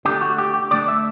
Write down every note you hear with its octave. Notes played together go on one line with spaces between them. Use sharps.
D3 A3 G4
F#4
G4
G4
D3 A3 D5
E5